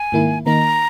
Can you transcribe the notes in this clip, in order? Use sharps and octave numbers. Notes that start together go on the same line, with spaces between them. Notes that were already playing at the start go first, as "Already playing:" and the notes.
Already playing: G#5
G#2 D#3 A#3 E4
D#3 A#3 D#4 A#5